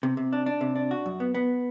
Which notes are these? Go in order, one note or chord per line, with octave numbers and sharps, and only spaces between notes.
C3
C3
D4
D4
C3
D4
F#4
F#2
B3
B3